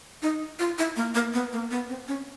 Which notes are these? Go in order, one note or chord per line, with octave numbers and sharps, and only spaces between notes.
D#4
F4
E4
A#3
A#3
B3
A#3
B3
C4
C#4